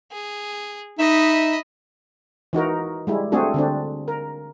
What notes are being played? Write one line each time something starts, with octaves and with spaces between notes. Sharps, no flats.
G#4
D#4 D#5 E5 B5
E3 D#4 F#4 A#4
G3 G#3 E4
A3 C4 D4 F#4 G#4 A4
D3 C4 D4
A#4